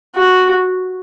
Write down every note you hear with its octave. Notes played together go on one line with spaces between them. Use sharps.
F#4